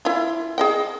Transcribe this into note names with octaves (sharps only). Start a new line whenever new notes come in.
E4 F4
G#4 D#5 G5